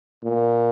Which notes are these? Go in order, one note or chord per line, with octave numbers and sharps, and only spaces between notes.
A#2